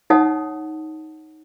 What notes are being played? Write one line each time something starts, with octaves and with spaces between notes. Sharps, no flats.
D#4 C#5 F#5 A5 D#6